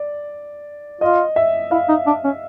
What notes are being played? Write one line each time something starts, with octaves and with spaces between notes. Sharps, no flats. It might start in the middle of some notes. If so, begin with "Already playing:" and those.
Already playing: D5
F4 D#5
E5
E4 F5
D#4
D4
C#4